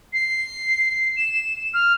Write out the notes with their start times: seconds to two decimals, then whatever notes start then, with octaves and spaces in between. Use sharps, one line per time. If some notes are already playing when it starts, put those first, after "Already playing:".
0.13 C7
1.17 E7
1.74 F6